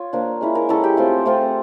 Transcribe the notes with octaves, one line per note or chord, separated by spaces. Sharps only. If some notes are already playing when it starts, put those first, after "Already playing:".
Already playing: F4 C#5
F3 A#3 D4
G#3 C#4 E4
A#4
G#3 C#4 E4 A4
G4
A3 C4 F4
A3 C4 F4